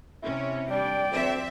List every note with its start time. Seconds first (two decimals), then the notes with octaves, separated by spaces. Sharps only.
0.23 C3 C#4 E4
0.70 G3 D4 D5 G5
1.11 D2 F3 C4 E5